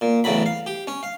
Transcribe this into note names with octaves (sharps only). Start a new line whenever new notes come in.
A#2
E2 A2 C#3 F#3 B5
F5
G4
C#4
F5